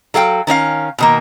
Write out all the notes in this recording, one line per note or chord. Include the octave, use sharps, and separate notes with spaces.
F#3 A4 F5 G5
D#3 C#4 D#4 F5
B2 D#3 A#3